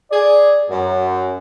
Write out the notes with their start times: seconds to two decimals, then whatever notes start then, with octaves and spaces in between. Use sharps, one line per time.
0.12 G#4 D5
0.70 F#2